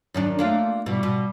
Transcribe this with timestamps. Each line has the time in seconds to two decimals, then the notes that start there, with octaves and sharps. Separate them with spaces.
0.14 F#2 D#3 D4
0.39 A3 A#3 D4 F4
0.86 B2 E3 G3
1.03 B2